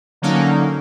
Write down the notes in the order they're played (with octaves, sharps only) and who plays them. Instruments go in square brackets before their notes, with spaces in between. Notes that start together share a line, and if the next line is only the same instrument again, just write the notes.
[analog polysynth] D3 F#3 A#3 C#4 D#4